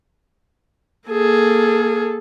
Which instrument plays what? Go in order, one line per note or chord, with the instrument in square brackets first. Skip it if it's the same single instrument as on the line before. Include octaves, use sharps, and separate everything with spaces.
[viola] A#3 G#4 [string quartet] A4